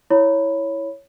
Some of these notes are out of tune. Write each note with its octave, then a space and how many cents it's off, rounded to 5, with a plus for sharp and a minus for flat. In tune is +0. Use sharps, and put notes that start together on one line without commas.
E4 +0 C#5 +0 B5 +0